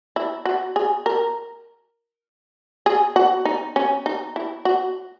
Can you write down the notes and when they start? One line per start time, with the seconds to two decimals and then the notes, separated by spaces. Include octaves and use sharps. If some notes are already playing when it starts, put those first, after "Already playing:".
0.16 E4
0.45 F#4
0.76 G#4
1.06 A#4
2.86 G#4
3.16 F#4
3.45 D#4
3.76 C#4
4.06 D#4
4.36 E4
4.65 F#4